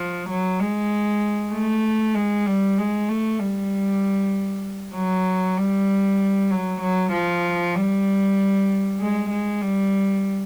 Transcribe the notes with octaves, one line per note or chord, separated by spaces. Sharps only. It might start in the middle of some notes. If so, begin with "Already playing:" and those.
Already playing: F3
F#3
G#3
A3
G#3
G3
G#3
A3
G3
F#3
G3
F#3
F#3
F3
G3
G#3
G#3
G3